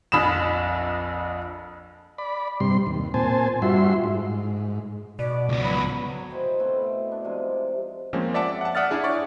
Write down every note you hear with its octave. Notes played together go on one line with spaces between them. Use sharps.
A#1 F2 B5 D#6 E7
D5 B5
G2 C3 G3 C6
D#2
A#2 C4 C5 G#5 A5
G2 G3 F4 F#4 E5 C6
G#2
B2 D5
C#2 B3
F#3 B5
F#3 G#5 A5
E4 C5 D#5 G5
B2 A3 C4 E4
D4
C3 D#3 F3 G#3
F3 G#3 A#3 C4 C#4
D5 E5 F#5 A5 D6
F#5 A5
D5 E5 F#5 D#6 F6 A6
D4 E4 G#4
C#5 D5 C#6